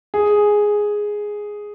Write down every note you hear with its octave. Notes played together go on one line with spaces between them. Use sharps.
G#4